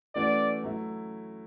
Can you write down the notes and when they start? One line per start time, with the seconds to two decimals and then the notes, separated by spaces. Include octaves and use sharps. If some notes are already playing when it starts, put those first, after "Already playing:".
0.15 E3 A3 C#4 F#4 D5
0.64 F#3 A3 E4